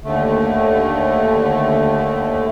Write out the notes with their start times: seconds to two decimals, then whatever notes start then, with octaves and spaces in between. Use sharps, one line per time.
0.05 D#2 D3 A3